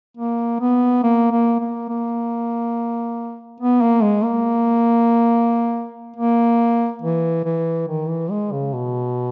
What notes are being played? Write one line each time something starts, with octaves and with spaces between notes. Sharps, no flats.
A#3
B3
A#3
A#3
A#3
A#3
B3
A#3
G#3
A#3
A#3
E3
E3
D#3
E3
G#3
C#3
B2